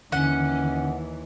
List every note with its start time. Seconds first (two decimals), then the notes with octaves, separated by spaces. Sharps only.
0.12 D#2 D3 E3 C#4 F#5